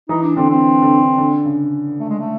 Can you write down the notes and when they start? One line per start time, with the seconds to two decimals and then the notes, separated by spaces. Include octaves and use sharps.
0.09 E3 D#4
0.23 D4
0.36 D3 C4
0.50 C4
0.82 D3
1.00 D3
1.18 D3
1.46 C#3
2.00 A3
2.10 G#3
2.19 A3